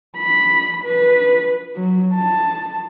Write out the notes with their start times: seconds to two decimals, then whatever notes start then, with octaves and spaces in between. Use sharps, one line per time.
0.18 B5
0.84 B4
1.76 F#3
2.15 A5